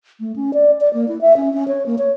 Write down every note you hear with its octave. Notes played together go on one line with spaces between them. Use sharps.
A3
C#4
D5
D5
A#3
E4
E5
C#4
C#4
C#5
A#3
C#5